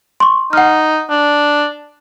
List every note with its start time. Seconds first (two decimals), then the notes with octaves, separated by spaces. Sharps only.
0.20 C6 C#6
0.53 D#4 F#5 F6
1.10 D4